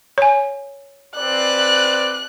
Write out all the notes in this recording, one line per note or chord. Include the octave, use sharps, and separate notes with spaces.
C#5 G#5
C4 B4 D5 F#6